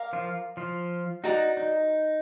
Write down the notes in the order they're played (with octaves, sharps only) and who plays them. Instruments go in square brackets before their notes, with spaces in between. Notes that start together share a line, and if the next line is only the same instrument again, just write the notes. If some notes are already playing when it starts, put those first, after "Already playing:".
Already playing: [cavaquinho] A#4 F5 A#5 D6
[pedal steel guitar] F3 F4
F3 F4
[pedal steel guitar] D#4 [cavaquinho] F#4 D5 F#5 A#5
[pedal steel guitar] D#4